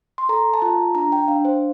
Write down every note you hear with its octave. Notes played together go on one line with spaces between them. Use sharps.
C6
A4 A#5
A5
F4 A#5
D4 A#5
G5
D4 F5
C5